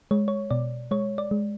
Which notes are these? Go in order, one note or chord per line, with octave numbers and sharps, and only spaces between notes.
G#3 C#5
C#5
B2 D5
G#3 C#5
D5
G#3